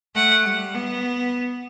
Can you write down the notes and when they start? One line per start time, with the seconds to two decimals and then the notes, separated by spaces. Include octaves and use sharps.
0.15 A3 F#5
0.45 G3
0.75 B3